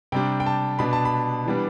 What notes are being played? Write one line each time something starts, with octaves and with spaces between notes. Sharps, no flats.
C3 G3 D4 G5
G5
A5
B2 B3 D4 B5
A5
B5
E3 G3 B3 D4